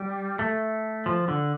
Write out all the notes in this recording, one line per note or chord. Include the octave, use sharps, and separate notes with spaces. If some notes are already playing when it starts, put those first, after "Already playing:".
Already playing: G3
A3
F3
D3